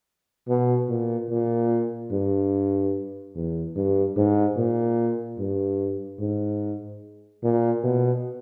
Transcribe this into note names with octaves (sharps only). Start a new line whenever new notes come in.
B2
A#2
A#2
G2
E2
G2
G#2
A#2
G2
G#2
A#2
B2